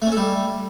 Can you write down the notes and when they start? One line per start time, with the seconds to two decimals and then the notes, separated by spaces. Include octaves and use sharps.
0.02 A3
0.07 C#4
0.12 A4
0.17 G3